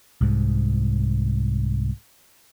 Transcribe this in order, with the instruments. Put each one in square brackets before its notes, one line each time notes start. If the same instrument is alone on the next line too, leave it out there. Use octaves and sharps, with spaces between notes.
[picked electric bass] C2 G#2